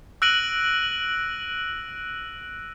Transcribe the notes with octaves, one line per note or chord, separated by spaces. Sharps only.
E6 F#6 A#6 D7 D#7 F#7